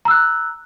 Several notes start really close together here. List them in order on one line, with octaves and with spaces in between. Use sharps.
A#5 E6 F#6